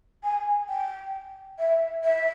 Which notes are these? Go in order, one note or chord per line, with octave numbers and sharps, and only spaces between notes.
G#5
G5
E5
E5